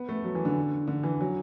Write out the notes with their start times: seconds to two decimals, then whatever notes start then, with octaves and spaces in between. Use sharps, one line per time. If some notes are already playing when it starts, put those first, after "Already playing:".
Already playing: B3
0.09 A3
0.24 F#3
0.35 E3
0.45 D3
0.87 D3
1.03 E3
1.21 F#3